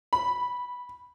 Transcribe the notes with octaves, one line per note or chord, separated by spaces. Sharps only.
B5